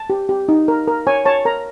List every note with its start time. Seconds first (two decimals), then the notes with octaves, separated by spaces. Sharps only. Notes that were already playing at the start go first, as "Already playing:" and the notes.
Already playing: A5
0.10 G4
0.29 G4
0.49 D#4
0.68 A#4
0.87 A#4
1.07 C#5 G#5
1.25 C#5 A5
1.45 A#4 A#5